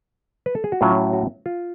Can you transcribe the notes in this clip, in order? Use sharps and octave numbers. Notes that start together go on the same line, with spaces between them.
B4
A4
G#4
F#4
A2 F#3 C#4 F4
F#4
F4